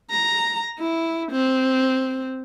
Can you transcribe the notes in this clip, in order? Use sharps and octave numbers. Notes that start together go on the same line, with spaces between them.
A#5
E4
C4